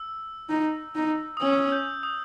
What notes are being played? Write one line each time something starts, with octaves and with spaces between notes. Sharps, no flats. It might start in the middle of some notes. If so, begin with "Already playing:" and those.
Already playing: E6
D#4
D#4
D#6
C#4 E6
G6
D#6